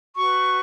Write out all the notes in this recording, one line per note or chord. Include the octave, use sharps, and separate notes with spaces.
F#4 B4 C#6